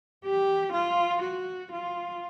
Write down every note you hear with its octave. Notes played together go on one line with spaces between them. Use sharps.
G4
F4
F#4
F4